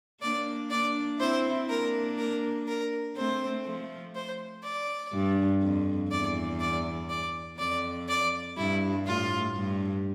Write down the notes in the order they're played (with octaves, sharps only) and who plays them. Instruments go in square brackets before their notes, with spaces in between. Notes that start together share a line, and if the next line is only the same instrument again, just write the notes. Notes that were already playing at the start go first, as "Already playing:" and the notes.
[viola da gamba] A#3 D4 [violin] D5
[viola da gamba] A#3 D4 [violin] D5
[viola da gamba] C4 E4 [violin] C5
[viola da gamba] A#3 D4 [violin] A#4
[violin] A#4
A#4
[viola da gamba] A3 C4 [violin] C5
[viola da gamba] F3 A3
[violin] C5
D5
[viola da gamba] G2
F2
[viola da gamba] E2 [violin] D5
[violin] D5
D5
[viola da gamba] F2 [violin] D5
[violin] D5
[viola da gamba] G2 [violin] E4
[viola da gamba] A2 [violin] F4
[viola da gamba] G2